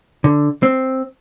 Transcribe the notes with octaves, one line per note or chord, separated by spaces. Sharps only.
D3
C4